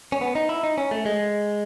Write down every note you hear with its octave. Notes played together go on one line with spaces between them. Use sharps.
C#4
B3
D#4
E4
D#4
C#4
A3
G#3